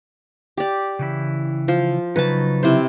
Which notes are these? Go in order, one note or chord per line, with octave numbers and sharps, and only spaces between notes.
G4 D5
C#3 E3 E4
F3
C#3 F#3 D#4 B4 A5
C3 E4 C5